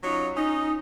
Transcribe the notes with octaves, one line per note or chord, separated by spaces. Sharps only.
F#3 C#4 D#4 F4 C#5
C#4 D#4